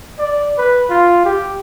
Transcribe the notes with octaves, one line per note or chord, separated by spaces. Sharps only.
D5
B4
F4
G4